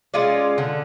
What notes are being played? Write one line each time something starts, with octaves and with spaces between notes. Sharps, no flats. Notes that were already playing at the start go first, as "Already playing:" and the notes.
G#3 C#4 F4 D5
D3